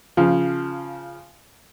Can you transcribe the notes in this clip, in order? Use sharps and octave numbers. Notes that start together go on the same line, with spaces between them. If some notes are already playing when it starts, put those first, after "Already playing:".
C#3 F3